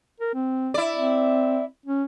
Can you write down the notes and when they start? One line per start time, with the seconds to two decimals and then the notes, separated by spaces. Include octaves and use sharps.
0.20 A#4
0.34 C4
0.74 E4 D5
0.96 C4
1.86 C#4